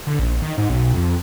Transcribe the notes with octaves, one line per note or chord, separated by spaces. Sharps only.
D3
A#1
D#3
G#2
B1
F2